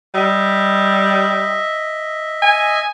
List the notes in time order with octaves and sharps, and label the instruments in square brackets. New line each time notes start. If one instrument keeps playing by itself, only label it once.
[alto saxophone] G3 [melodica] D#5 E5
[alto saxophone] G#5